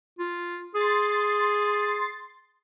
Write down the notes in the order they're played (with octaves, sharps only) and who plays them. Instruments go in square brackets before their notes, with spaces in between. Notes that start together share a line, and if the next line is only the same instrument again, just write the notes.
[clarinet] F4
[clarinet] G#4 [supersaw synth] C6 A6